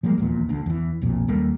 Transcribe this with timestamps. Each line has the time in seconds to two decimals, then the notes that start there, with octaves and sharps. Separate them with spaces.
0.03 F3 G3 G#3 A#3
0.18 D#1 A#1 E2 A#2
0.49 D2 D3
0.66 E2 E3
1.02 B1 F2 A#2
1.28 D#2 G3 A3 A#3